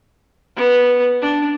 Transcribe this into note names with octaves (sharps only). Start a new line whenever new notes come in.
B3
D4